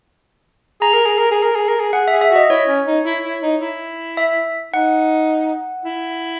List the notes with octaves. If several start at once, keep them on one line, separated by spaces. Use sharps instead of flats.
G#4 A#5
A#4
G#4
A#4
G#4
A#4
G#4
A#4
G#4
G#4 F#5
E5
G#4
E5
F#4 D#5
E4 C#5
C#4
D#4
E4
E4
D#4
E4
E5
D#4 F#5
E4